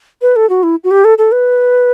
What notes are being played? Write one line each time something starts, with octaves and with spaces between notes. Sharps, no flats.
B4
A4
F#4
E4
F#4
G4
A4
A4
B4